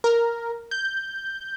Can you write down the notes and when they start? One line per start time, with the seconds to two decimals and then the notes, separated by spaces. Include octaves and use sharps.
0.04 A#4
0.71 G6